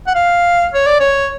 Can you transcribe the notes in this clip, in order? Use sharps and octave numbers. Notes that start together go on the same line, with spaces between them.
F#5
F5
C#5
D5
C#5